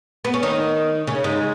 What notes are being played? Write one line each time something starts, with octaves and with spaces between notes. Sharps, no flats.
B3
C#4
D#3 D#4
C#3 C#4
G#2 G#3